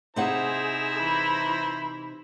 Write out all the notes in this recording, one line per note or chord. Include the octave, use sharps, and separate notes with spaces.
C3 D#4 E4 G#4 C5 F#5 A#5
E3 B5